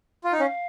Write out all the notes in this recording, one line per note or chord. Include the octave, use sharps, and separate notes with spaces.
F4
D#4
C#4 F5